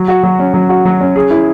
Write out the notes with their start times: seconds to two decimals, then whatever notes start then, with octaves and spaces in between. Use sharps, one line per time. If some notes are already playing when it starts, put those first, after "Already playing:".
Already playing: F#3
0.08 F#4
0.23 F#3
0.39 C#4
0.54 F#3
0.69 F#4
0.85 F#3
1.00 C#4
1.16 G#4
1.30 E4